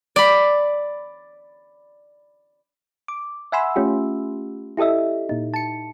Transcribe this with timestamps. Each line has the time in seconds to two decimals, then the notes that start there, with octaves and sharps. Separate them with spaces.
0.16 D5 B5
3.08 D6
3.52 E5 F#5 G#5 B5 C6 E6
3.76 A3 C#4 F4 G4
4.77 E4 G4 A4 D#5 E5
5.29 A#2 D#4
5.54 A5 C#7